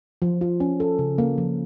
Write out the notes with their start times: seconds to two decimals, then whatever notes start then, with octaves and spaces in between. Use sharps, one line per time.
0.22 F3
0.41 F4
0.60 C#4
0.80 A4
0.99 C#3
1.18 A#3
1.38 F3